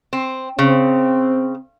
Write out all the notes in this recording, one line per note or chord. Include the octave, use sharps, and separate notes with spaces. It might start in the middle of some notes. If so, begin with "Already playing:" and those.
C4
C#3 C4